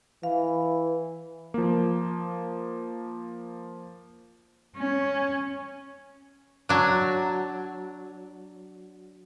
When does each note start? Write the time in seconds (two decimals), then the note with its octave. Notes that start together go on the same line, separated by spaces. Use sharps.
0.23 E3 F5
1.54 F3 A#3
4.77 C#4
6.69 F#3 D4